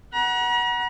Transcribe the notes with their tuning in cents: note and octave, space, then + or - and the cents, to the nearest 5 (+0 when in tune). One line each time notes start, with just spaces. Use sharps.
F#5 +5 A#5 +45